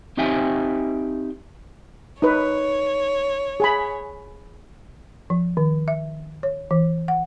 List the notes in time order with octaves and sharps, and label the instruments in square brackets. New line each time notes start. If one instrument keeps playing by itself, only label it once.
[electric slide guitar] C4 D#4 G4 E5 G5 G#5
[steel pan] D#4 B4 [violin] C#5
[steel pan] G#4 G#5 B5
[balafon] F3
D#3
E5
C#5
E3
F#5